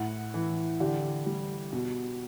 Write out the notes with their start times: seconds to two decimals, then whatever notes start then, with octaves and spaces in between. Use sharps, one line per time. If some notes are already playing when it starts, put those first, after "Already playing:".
Already playing: A2 F#5
0.34 E3
0.80 D3 G4
1.26 G3
1.73 B2